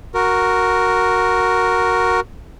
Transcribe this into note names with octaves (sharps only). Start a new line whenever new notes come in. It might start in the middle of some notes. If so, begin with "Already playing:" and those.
F#4 A#4